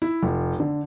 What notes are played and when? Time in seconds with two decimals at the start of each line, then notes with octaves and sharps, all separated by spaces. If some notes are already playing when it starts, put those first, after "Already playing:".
0.02 E4
0.23 F1
0.60 D3